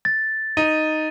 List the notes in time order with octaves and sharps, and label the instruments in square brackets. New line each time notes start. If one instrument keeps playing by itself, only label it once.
[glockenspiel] A6
[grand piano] D#4 [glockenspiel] D#7